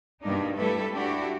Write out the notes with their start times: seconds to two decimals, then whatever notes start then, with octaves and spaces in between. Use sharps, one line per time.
0.22 G2 B2 G3 A#3 D4 D#4
0.56 G3 A3 E4 A4 B4 E5
0.93 D4 E4 F#4 G4